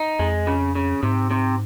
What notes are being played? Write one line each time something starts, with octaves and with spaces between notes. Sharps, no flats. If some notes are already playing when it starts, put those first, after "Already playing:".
Already playing: D#4
F2 G#3
C#3
C#3
G#2 C3
C3